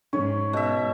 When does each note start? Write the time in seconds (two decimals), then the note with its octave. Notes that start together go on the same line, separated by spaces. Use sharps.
0.13 G#2 C#4 C#5
0.53 B2 E5